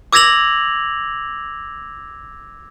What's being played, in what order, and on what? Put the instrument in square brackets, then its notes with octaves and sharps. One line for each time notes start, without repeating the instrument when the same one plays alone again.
[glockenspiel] D6 E6 G#6 A#6 F7 F#7